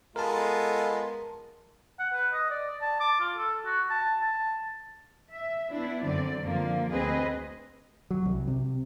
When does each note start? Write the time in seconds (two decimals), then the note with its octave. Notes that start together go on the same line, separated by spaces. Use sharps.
0.16 G#3 B3 F4 A4 A#4 D#5 A5
1.99 F#5
2.13 B4
2.34 D#5
2.51 D5
2.82 A5
3.00 D6
3.20 F4
3.36 A4
3.65 F#4
3.90 A5
4.22 A5
5.33 E5
5.71 B3 D4 E4
6.03 F#2 D3 C4 D5
6.42 D3 F3 A#3
6.92 D2 C4 G#4 B4 D#5
8.11 F#3
8.25 C2
8.48 C3